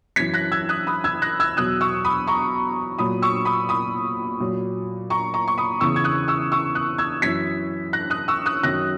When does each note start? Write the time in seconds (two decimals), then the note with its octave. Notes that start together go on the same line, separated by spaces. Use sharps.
0.16 F#2 E3 G#6 B6
0.34 F#6 A#6
0.52 E6 G#6
0.69 D#6 F#6
0.87 B5 D#6
1.04 E6 G#6
1.22 F#6 A#6
1.40 E6 G#6
1.57 E2 B2 F#3 D#6 F#6
1.81 C#6 E6
2.05 B5 D#6
2.27 A#5 C#6
2.98 A#2 F#3 B5 D#6
3.22 C#6 E6
3.45 B5 D#6
3.69 B5 D#6
4.40 A#2 F#3
5.10 A#5 C#6
5.34 A#5 C#6
5.48 C#6
5.58 B5 D#6
5.81 E2 C#3 E3 C#6 E6
5.96 G#6
6.04 D#6 F#6
6.28 C#6 E6
6.52 C#6 E6
6.75 D#6 F#6
6.98 E6 G#6
7.22 F#2 E3 G#6 B6
7.93 F#6 A#6
8.10 D#6 F#6
8.28 C#6 E6
8.46 D#6 F#6
8.63 F#2 D#3 F#3 F#6 A#6